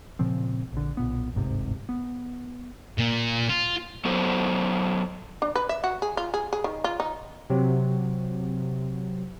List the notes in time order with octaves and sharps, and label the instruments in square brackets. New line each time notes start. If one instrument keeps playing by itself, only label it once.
[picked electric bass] A#2 C#3 F3 C4
A#1 D3
B1 A#2 B3
D1 G1 G#2 C3
B3
[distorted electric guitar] A#2
F4
[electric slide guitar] F#3 B3 A4 C5
[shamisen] D4
B4
E5
F#4
G#4
F4
G#4
G#4
D#3
F4
D#4
[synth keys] C3 F#3